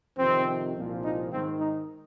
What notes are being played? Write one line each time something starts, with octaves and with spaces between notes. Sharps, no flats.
F2 C3 D#3 C4
C2 A#2 F3
D#4
G#2 D#3 C4
D#4